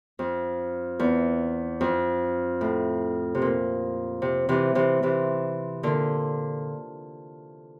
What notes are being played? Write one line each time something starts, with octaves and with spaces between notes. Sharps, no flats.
F2
E2
F2
A2
C3
A#2
C3
C3 E3
C3 E3
C3 E3
A#2 D3